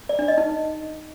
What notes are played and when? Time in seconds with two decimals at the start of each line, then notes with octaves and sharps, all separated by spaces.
0.09 D5
0.19 D4
0.28 D#5
0.38 D#4